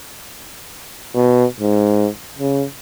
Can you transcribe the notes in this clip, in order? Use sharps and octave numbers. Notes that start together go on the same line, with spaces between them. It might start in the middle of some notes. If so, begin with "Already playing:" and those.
B2
G#2
C#3